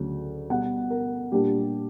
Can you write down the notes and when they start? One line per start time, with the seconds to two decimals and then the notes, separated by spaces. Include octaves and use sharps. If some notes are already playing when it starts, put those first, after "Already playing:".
Already playing: D2 C#3 F#3 C#4
0.50 B2 G3 B3 F#5
0.90 A#4
1.32 A#2 G3 A#3 D4 G4